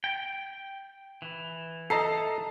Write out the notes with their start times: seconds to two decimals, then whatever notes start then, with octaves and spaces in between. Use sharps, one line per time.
0.04 G5
1.22 E3
1.90 A4 D#5 A5 A#5 C7